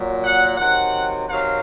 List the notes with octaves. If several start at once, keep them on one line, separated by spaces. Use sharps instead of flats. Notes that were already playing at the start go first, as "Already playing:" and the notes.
Already playing: A#2 F#3
F#5
C3 D#3 F#3 F#5
C3 D#3 F#3 F5